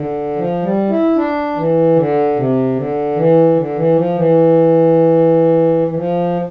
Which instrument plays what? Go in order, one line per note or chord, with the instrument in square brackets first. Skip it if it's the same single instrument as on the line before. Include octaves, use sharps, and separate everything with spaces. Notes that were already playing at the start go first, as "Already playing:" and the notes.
Already playing: [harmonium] D3
F3
G3
E4
D4
E3
D3
C3
D3
E3
D3
E3
F3
E3
E3
F3